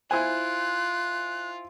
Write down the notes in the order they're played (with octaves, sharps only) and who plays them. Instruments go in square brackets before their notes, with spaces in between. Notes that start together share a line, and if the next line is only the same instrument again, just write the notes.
[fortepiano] E4 C5 G#5 [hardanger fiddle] F4 [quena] F#6